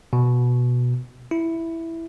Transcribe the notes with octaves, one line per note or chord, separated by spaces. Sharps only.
B2
E4